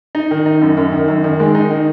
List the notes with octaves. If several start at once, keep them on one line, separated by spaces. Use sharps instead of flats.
D#4
D#3
D#4
F#2
F#2
D#3
F#2
D#3
G#3
D#4
D#3